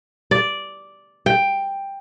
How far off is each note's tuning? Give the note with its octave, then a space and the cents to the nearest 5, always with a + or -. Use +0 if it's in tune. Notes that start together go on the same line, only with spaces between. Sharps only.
D5 -5
G5 +10